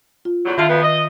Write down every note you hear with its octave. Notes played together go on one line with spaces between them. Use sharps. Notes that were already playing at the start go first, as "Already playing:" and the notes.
F4
E2 D3 F#3
D3 D#3 E4 F4 E5 A5
F2 B2 B3
D#5